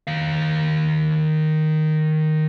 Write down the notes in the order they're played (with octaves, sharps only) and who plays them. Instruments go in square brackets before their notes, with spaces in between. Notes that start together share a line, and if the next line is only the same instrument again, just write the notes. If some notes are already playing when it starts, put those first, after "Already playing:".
[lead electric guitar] D#3 F5